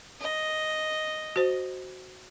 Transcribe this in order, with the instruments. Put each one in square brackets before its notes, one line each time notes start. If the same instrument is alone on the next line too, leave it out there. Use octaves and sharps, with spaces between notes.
[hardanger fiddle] D#5
[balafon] F#4 C5